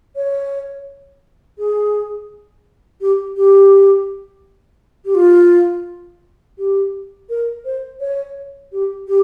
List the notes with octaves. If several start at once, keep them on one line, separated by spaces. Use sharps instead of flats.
C#5
G#4
G4
G4
G4
F4
G4
A#4
C5
C#5
G4
G4